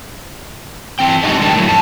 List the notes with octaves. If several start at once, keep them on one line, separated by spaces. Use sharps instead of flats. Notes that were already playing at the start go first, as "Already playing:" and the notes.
E3 C4 G5
G#3 D4 D#4 F#4 G4 D#5
D#3 D4 D#4 G4 A#4 A5
A2 F#3
F2 A5